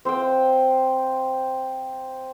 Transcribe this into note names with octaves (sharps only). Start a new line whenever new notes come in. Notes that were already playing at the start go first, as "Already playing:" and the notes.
C4 C5 F5 G5